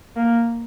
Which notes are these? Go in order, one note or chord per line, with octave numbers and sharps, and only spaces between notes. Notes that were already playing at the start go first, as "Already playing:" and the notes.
A#3